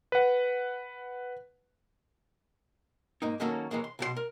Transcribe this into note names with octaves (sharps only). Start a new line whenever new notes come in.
B4 F#5
G#2 A#3 D#4
D#3 F#3 A#3 C#4 F#4 A4
E3 F#3 G#3 A#3
C6
B1 B2 F#4 C6
A#4